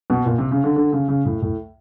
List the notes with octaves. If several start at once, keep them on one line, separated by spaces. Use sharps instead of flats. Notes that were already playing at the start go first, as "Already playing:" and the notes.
B2
A#2
C3
C#3
D3
D3
C#3
C#3
A2
A2